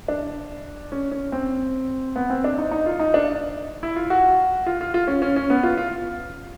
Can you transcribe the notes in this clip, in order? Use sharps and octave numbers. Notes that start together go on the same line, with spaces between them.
D4
C#4
C#4
C4
B3
C4
D4
D#4
D#4
F4
D#4
D4
E4
F4
F#4
F4
F4
F4
C#4
C#4
C#4
B3
F4
F4